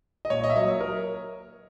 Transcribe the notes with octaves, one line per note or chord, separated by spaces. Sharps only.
D#5
A#2 C#5
D#5
E5
F#3 A#3 D#5
C#5
A#4